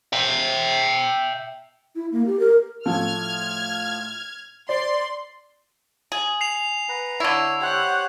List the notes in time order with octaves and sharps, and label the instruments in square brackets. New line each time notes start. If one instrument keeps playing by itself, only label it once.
[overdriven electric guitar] E5 G5
[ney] E4
A#3
G4
A#4
[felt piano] A2 F3 A3 [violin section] F6 G#6
[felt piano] C5 [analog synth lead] D5 [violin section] C6
[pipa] G#4
[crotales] C7 F7
[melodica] B4 F#5 A#5
[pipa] D3 E4 [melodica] C#5
[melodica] G4 C5 C#5 [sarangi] F#5